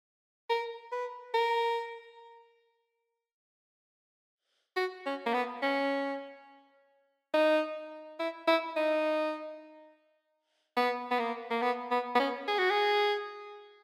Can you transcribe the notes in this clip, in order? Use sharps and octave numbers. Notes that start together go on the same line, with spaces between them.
A#4
B4
A#4
F#4
C#4
A#3
B3
C#4
D#4
E4
E4
D#4
B3
B3
A#3
A#3
B3
B3
B3
C#4
G#4
F#4
G#4